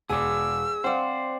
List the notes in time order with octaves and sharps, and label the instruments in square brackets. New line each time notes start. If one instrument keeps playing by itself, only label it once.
[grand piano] E1 [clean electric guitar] G#4 D5 [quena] E6
[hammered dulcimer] C4 D5 F5 [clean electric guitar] C5 [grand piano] F#5